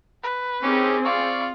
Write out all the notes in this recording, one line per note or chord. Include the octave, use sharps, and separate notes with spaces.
B4
D#3 C4 C#4 G4 G#4
F4 D5 F5 C#6